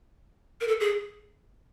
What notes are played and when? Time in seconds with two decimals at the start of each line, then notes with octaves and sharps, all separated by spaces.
0.61 A#4
0.68 A4
0.80 G#4